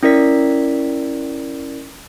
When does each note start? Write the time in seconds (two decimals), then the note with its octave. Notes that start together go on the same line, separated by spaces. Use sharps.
0.03 C#4 E4 A#4 D5 B6